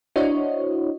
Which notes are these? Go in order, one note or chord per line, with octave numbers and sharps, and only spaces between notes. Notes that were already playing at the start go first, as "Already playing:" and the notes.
D4 E4 F#4 C5 C#5 D#5